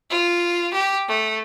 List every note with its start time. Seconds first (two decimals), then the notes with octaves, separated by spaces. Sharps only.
0.11 F4
0.74 G4
1.08 A3